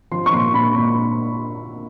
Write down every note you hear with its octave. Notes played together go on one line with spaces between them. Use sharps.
F3 C6
C#6
A#2 C6
A#2 B5
A#2 B5